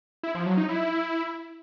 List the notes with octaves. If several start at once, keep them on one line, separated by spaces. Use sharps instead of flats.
E4
F3
F#3
D#4
E4